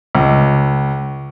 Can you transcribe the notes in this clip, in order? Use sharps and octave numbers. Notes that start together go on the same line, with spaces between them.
C#2